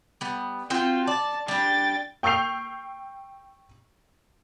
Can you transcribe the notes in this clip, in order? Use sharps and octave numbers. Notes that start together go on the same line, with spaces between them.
G3 B3
C4 F4 F#4 G5
D5 A5
G3 D4 G5 A6
G5 C#6 E6 G6 C7 F7